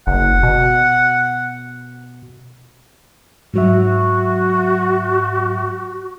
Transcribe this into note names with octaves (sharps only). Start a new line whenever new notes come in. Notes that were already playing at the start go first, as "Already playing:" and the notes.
F#1 F#5
B2
G#2 F#3 F#4 E5